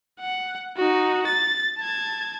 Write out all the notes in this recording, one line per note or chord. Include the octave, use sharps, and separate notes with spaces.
F#5
D#4 F#4
A6
A5 G#6